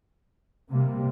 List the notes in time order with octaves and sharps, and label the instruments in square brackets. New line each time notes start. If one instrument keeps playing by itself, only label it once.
[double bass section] C3 G3 A#3